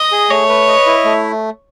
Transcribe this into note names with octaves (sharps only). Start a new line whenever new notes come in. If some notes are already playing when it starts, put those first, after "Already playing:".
Already playing: D#5
G#4
A3 C#5
B4
D#5
E4
A3